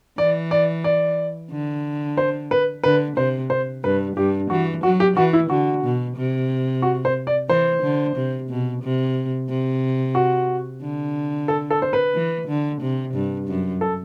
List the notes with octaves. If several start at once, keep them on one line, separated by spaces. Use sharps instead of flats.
E3 D5
D5
D5
D3
C5
B4
D3 B4
C3 C5
C5
G2 B4
G2 G4
E3 F#4
F#3 F#4
G4
E3 F#4
E4
D3 F#4
B2
C3
F#4
C5
D5
E3 C5
D3
C3
B2
C3
C3
F#4
D3
A4
A4
C5
B4
E3
D3
C3
G2
F#2
A4